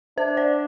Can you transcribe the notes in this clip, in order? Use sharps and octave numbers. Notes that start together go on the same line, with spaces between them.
D4 C5
D5